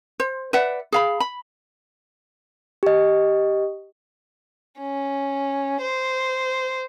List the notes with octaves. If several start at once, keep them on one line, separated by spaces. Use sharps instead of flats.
C5
B4 D5 E5 F#5
G#4 F5 B5
B5
G4 D#5
C#4
C5